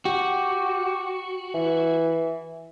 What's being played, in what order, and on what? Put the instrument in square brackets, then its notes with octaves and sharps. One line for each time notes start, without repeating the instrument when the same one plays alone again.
[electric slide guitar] F#4 [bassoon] G4
[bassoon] E3